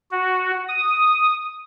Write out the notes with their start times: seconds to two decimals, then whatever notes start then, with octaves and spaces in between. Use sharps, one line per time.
0.11 F#4
0.68 D#6